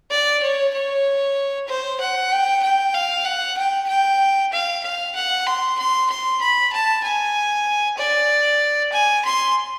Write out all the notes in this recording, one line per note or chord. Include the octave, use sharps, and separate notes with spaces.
D5
C#5
C#5
C5
F#5
G5
G5
F5
F#5
G5
G5
F5
F5
F#5
C6
C6
C6
B5
A5
G#5
D5
G#5
C6